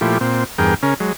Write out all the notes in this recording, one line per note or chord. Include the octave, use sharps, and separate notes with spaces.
A#2 F3 A3 E4 G4
A#2 C4
E2 G2 G#4 A#4 G5
C#3 C#4 A#4
F#3 G#3